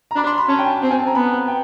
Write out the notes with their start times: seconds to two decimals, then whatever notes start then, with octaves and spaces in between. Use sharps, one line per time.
0.11 A#5
0.16 D4 B5
0.27 C6
0.38 B5
0.48 C#4 A5
0.59 G5
0.66 G#5
0.82 C4 G5
0.91 G#5
0.99 A5
1.07 A#5
1.15 B3 B5
1.48 G5